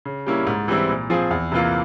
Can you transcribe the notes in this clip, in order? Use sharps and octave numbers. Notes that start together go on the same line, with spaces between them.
C#3
G3 A#3 C#4 E4
G#2
E3 G3 C4 E4
A#2
F3 C4 F4 G#4
E2
C3 E3 A#3 F4